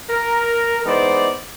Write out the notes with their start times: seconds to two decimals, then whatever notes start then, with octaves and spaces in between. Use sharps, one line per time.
0.10 A#4
0.85 E3 G#3 B3 D#4 C5 D5